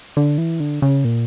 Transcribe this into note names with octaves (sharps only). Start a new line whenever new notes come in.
D3
E3
D3
C#3
A#2